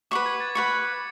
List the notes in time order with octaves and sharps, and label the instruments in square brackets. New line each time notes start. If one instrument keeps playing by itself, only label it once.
[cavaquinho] B4 F#5 C#6 [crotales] D6
[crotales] G#6
A6
[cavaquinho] B4 F#5 C#6 [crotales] C#7